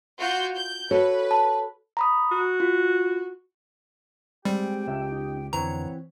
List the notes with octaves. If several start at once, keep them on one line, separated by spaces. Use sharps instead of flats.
F4 F#4 G6
G6
F#4 A4 B4 C#5
A5
A#5 B5 D#6
F#4
F4
G3 G#3 C4 G4 G5
C#2 E5
D#4
F2 D3 E3 B3 C4 B4 C#5 A#5